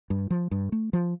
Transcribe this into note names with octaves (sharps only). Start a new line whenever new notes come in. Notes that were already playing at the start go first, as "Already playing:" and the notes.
G2
F3
G2
A3
F3